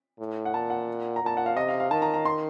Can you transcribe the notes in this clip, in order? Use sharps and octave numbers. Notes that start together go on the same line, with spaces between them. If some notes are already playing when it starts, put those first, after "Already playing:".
A2
F#5
A#2 A5
F#5
A#5
A#2 A5
F#5
F5
C3 D#5
F5
F5
D#3 A5
A#5
A#5
C6